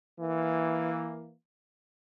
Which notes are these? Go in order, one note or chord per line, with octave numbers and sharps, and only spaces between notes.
E3 A#3